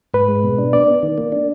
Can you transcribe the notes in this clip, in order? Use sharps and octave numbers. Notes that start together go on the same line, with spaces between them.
G#2 B4
G#3
B2
D4
B3 D5
B3
D#3
A#3
D4